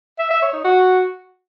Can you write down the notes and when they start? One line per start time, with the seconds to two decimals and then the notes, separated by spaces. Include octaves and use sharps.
0.19 E5
0.30 E5
0.42 C#5
0.53 D#4
0.64 F#4